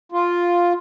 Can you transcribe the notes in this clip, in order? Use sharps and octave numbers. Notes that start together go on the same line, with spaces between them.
F4